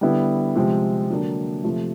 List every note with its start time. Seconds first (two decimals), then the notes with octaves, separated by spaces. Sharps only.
0.01 D3 G3 B3 E4
0.56 C3 F3 G#3 C4
1.09 D3 F#3 A#3 D4
1.64 C3 F3 A3